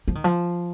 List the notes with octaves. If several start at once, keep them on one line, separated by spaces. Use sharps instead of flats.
F3
D#3
F3